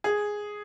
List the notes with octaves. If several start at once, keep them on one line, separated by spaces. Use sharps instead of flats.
G#4